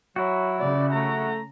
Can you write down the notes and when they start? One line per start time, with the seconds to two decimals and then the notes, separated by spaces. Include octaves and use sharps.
0.16 F#3 E4 F#4
0.60 C#3 D5
0.93 A3 A#5